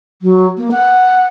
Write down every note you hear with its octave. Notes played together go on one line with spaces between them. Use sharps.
F#3
A#3
F#5